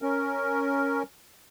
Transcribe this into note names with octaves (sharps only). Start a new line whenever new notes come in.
C#4 A#4